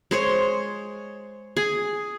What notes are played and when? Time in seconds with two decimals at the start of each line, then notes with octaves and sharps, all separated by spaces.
0.11 G#3 C5 C#5
1.57 G#4